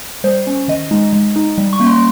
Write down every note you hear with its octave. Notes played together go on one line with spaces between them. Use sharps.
G3 C5
C#4
D#3 D#5
G#3 D#4
G#3
D#4
G3
C#6
A#3 C#4
C6